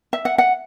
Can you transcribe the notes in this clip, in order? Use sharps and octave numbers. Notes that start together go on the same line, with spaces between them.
E5
F#5
F#5